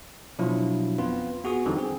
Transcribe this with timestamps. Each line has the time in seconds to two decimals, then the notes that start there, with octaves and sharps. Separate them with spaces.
0.39 B2 F3 F#3 D4 E4 F4
0.98 F2 B3 C4 F4 B4
1.44 B3 F#4 G#4 C#6 D#6
1.65 E2 D3 E3 G3 C4 D#4
1.77 C4 G#4